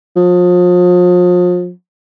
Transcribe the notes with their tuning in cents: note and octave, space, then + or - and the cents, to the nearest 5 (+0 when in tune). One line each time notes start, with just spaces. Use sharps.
F3 +35